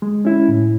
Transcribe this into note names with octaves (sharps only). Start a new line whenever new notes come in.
G#3
C#4 E4
A2